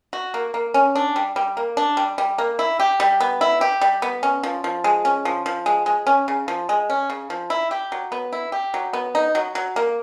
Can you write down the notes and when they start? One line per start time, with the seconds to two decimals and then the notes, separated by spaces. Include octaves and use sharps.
0.13 F#4
0.34 A#3
0.54 A#3
0.74 C#4
0.95 D4
1.16 G3
1.36 G3
1.57 A#3
1.77 D4
1.97 G3
2.18 G3
2.38 A#3
2.59 E4
2.80 G4
3.00 G3
3.20 B3
3.41 E4
3.61 G4
3.81 G3
4.02 B3
4.23 C#4
4.43 F3
4.64 F3
4.84 G#3
5.05 C#4
5.25 F3
5.46 F3
5.66 G#3
5.86 G#3
6.07 C#4
6.28 C#3
6.48 F3
6.69 G#3
6.90 C#4
7.10 C#3
7.30 F3
7.50 E4
7.71 G4
7.92 F#3
8.12 B3
8.33 E4
8.52 G4
8.74 F#3
8.93 B3
9.15 D#4
9.35 F#3
9.55 F#3
9.76 A#3